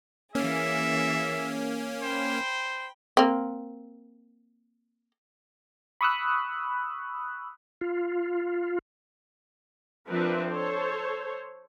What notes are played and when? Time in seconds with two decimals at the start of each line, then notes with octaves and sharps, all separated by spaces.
0.35 E3 A#3 C#4 G#4 E5
2.03 C5 G5 B5
3.17 A#3 C4
6.01 B5 C#6 D#6 E6 F#6
7.81 F4
10.07 F3 C4 D4 A#4 B4 E5
10.50 A4 C5 C#5